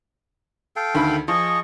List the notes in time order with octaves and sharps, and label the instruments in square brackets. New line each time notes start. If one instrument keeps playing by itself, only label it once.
[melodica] A4 F5 G5
[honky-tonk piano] D2 D#3 B5
[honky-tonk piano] F3 [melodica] G#4 D#5 C#6